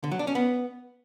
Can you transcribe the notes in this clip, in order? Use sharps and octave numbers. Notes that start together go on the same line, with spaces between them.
D3
F#3
D4
C#4
B3